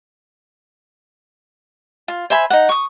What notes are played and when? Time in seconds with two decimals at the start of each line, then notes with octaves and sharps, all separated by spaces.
2.08 F4
2.30 C5 E5 G#5 B5
2.50 D#4 F#5
2.69 C#6 D#6